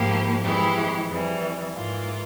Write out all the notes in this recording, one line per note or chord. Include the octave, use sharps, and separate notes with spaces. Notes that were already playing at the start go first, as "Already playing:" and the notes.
Already playing: G#2 F3 A#3 E4 G4
F2 E3 G#3 E4 G4
F2 E3 G3
G#2 E3 A#3 F4